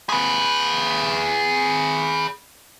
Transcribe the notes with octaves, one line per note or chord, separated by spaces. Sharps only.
G#4 B4